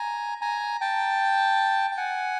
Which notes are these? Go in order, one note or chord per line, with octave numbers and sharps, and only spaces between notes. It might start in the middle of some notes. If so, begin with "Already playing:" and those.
Already playing: G#5 A#5
G#5 A#5
G5 A5
G5
F#5 G#5